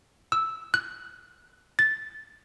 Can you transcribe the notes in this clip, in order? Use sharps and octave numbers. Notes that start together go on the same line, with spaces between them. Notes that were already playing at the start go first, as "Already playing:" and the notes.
E6
F#6
A6